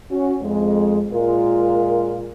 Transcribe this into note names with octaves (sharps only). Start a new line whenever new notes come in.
C#4 F#4
F2 G#3
A#2 G#3 F4 A#4